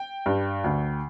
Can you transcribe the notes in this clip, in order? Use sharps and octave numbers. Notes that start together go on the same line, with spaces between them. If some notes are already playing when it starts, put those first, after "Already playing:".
Already playing: G5
G2
D2